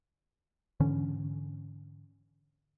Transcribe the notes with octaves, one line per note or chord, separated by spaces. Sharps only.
G#2 D3 E3 C#4